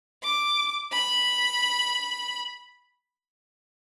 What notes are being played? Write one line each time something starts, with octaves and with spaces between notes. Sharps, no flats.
D6
B5